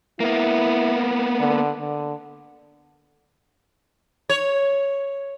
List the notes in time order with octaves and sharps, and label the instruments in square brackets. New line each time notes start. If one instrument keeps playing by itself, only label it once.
[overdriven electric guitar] A#3 B3 [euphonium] E4
[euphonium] D3
D3
[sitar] C#5